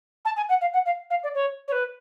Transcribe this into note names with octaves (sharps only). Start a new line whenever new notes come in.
A5
G#5
F#5
F5
F#5
F5
F5
D5
C#5
C#5
B4